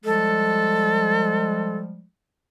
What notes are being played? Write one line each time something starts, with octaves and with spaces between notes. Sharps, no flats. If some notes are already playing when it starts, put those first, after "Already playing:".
F3 G3 G#3 A4